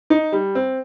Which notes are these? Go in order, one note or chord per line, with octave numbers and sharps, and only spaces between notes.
D#4
G3
C4